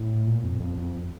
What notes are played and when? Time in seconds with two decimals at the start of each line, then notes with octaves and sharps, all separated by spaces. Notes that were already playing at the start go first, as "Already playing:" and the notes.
Already playing: A2
0.27 A#2
0.44 F2
0.60 F2
0.78 F2